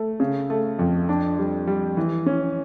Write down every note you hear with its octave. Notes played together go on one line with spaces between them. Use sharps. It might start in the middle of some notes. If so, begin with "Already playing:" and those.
Already playing: A3
C#3
A3
F2
D4
G3
G3
E3
C#4